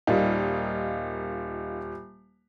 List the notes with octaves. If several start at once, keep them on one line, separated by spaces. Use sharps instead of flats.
D#1 G3 D#4 F4 A#4